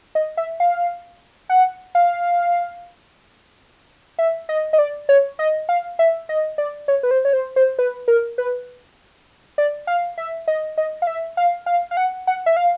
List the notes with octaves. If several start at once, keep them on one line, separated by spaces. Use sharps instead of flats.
D#5
E5
F5
F#5
F5
E5
D#5
D#5
D5
C#5
D#5
F5
E5
D#5
D5
C#5
B4
C5
C#5
C5
C5
B4
A#4
B4
D5
F5
E5
D#5
D#5
F5
E5
F5
F5
F5
F#5
F#5
E5
F5